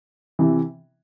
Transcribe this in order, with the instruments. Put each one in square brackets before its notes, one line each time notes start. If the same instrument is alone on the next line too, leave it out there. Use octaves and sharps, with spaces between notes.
[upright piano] C3 E3